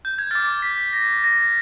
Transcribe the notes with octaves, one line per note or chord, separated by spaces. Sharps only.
G6
G#6
D6 F6 A6
B6
A#6
A#6